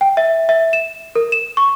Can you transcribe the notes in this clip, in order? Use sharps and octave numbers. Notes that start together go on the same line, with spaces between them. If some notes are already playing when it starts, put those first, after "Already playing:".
G5
E5
E5
E7
A#4
E7
C#6